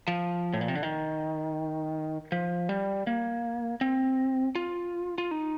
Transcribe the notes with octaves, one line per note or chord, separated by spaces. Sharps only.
F3
A2
A#2
C3
D3
D#3
F3
G3
A#3
C4
F4
F4
D#4